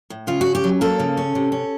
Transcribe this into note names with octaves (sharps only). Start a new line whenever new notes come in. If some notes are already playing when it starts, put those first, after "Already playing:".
A2
C#3 F4
C#4 F#4
G4
F#3
A#3 A4
C#3
C#4
C3
C#4